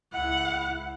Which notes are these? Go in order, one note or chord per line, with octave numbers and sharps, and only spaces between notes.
C#2 E4 F#5